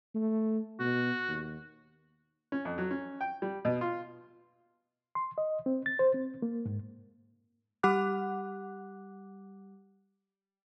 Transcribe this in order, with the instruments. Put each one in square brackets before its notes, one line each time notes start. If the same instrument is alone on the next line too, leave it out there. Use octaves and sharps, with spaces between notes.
[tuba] A3
[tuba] B2 [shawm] F#4
[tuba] D#2
[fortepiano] C#4
F2
F#3
C#4
G5
G3
B2
F4
[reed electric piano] C6
D#5
C4
A6
C5
C4
A#3
G#2
[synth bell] G3 G4 F#5 D6 F#6